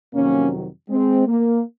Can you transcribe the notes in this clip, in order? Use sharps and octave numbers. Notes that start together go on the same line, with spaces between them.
F2 C3 D#3 F#3 A#3 C#4
G#3 C4
A#3